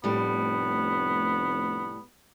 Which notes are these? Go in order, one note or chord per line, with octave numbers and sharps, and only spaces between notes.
F1 A2 G3 B3